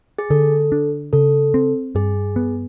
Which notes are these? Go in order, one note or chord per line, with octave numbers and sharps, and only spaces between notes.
G#4
D3 A4
D4
C#3 A4
C4
G2 G#4
B3